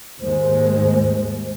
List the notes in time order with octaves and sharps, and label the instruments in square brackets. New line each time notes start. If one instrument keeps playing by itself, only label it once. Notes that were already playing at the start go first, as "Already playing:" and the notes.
[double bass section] D#2 G#2 G#3 [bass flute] C5